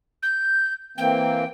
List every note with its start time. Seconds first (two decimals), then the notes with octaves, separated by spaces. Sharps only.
0.23 G6
0.98 E3 A#3 C4 G5